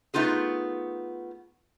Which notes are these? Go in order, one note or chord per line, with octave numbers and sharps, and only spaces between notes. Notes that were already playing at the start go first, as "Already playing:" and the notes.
A3 B3 D#4 F4 G#4